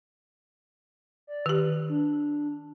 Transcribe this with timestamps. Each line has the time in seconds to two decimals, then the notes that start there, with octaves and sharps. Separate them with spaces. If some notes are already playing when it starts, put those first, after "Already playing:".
1.27 D5
1.46 D#3 G4 B4
1.89 D4